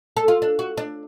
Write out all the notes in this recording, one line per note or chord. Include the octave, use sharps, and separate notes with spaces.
A4
F4
D4
F#4
D4